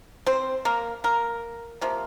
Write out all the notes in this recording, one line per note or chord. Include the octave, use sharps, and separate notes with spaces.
C4 C5
A#3 A#4
A#3 A#4
C3 F3 A#3